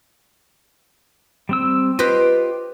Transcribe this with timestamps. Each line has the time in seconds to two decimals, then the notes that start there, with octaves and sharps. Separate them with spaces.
1.49 G3 C4 E6
1.99 F4 G4 B4 C5 D#5